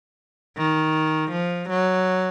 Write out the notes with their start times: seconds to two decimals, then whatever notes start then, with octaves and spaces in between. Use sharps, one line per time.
0.58 D#3
1.31 F3
1.69 F#3